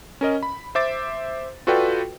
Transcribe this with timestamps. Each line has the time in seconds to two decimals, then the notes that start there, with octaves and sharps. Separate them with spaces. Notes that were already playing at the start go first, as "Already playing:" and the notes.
0.21 C#4 A#4 D#5
0.43 B5
0.75 C5 E5 D6 A6
1.67 F4 F#4 A4 B4 D5 G5